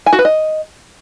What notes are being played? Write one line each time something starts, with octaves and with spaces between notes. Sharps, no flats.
G#5
F#4
B4
D#5